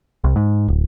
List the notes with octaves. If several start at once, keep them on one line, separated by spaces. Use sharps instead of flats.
C2
G#2
D1